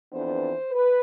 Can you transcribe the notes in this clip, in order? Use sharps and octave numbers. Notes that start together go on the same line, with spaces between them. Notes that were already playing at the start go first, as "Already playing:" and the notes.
F2 E3 B3 D4 C5
B4